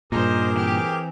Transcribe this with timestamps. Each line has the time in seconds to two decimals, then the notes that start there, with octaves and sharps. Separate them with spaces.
0.12 G2 A#2 D#4 G#4 A#4 C5 D6
0.56 E3 C4 G4